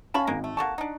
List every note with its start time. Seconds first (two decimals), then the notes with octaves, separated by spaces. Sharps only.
0.14 C#4 F5 G#5 A5 B5 C#6
0.27 G#1 G#3 A#3
0.44 A3
0.57 A#3 A4 F#5 A5 C#6
0.78 D4 D#4